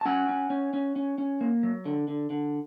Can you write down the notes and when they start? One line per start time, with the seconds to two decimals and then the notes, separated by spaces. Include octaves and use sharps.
0.01 A5
0.06 C#4 F#5 G#5
0.29 C#4
0.50 C#4
0.74 C#4
0.96 C#4
1.18 C#4
1.41 A#3
1.63 F#3
1.85 D3
2.08 D3
2.30 D3